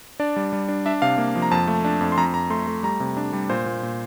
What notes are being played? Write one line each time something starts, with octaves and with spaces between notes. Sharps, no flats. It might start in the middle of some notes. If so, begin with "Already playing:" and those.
D4 D5
G3
G3
D4
D4 E5
C3 F5
A#3
F3
A#5
F2 A5
A3
D4
F2
C6
F2 A#5
F2 A#5
A3 C6
A3
G3 A#5
C3
D4
G3
A#2 C5
A#2
A#2